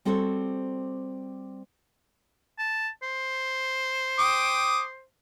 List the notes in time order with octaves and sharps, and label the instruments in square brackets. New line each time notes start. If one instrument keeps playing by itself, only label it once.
[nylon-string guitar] G3 C4 F#4 A4 C5 C#5
[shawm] A5
C5
[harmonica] G5 D6 D#6